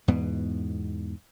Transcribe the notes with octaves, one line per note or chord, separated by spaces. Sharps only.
E2 G#2 B2 B3